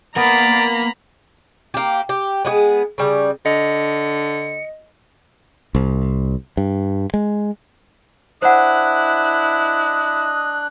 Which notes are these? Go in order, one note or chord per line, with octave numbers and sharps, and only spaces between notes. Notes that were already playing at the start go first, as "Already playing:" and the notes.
A#3 B3 A#4 D5 A#5 B5
A#3 G4
G4
G#3 B3 G4 G#4
C#3 G3
D3 D#5 C#7
C2
G2
G#3
D4 E4 C5 D#5 F#5 F#6